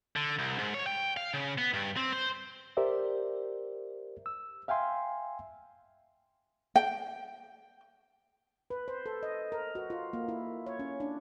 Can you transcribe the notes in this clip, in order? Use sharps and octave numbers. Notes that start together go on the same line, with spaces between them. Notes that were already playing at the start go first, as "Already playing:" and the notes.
D3
C2
G#2
C#5
G5
F5
C#3
B3
G2
C4
C5
G4 A#4 C5 D5 E5
E6
E5 F5 G5 G#5 C6
G5
B4
C5
A4
D#5
A#4
F#4
F4
A#3
E4
C#5
C#4
D4